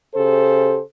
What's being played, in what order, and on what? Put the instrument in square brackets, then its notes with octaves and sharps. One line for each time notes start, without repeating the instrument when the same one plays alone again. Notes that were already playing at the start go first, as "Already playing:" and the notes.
[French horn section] C#3 G4 A4 C5